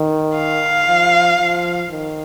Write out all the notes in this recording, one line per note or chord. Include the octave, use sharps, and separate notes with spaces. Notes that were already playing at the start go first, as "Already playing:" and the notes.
Already playing: D#3
F5
F3
F3
D#3